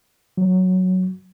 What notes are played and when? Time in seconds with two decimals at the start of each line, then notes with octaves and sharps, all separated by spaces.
0.37 F#3